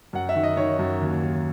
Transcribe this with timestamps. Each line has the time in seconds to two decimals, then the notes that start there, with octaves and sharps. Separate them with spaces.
0.13 F#2 F#5
0.29 E5
0.35 D#3
0.43 D#5
0.57 D#3 C#5
0.79 F#2
1.01 D#2
1.23 D#2